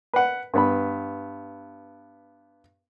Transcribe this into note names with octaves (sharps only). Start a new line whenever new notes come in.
B4 F#5
G2 B3 B5